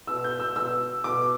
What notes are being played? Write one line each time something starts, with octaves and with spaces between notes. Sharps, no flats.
B2 E6
G6
E6
B2 E6
B2 D6